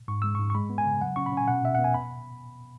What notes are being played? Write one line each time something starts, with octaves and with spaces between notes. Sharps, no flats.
G#2 C#6
G#3 E6
G#2 C#6
C#6
G#3 B5
B3
G#5
C#3
F#3 F#5
C#4 C#6
B5
C#4
G#5
B2 F#5
B2 E5
B3 F#5
G#5
B5